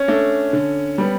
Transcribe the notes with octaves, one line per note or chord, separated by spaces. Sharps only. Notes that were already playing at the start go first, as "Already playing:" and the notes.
Already playing: C#4
A3 D4
D3
G3 B3